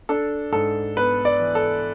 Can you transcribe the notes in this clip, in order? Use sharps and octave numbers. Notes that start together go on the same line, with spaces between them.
D4 A4
G#2 A4
B3 B4
D5
E3
A4